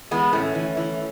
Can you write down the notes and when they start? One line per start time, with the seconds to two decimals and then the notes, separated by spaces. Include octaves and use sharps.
0.11 E3 G#3 B3
0.33 A2 A3 C#4
0.55 E3
0.77 E3